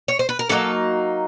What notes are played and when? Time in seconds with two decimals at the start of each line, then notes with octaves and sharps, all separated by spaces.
0.08 C#5
0.19 C5
0.29 B4
0.39 A#4
0.49 D3 F#3 A#3 D#4 A4